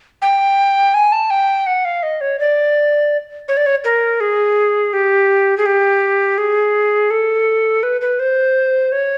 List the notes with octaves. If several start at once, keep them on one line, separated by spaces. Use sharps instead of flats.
G5
G#5
A5
G5
F#5
F5
D#5
C#5
D5
C#5
D5
C#5
A#4
G#4
G4
G#4
G4
G#4
A4
B4
B4
C5
C#5